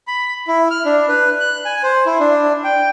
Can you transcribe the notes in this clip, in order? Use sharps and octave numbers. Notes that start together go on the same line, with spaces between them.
B5
E4
F6
D4
B4
F#6
G#5
C5
E4
D4
G5